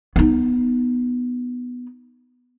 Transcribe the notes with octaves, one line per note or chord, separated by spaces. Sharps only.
B3 D#4